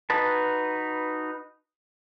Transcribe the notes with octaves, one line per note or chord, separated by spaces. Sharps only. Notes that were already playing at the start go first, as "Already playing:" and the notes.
D#4 F#4 B4 A5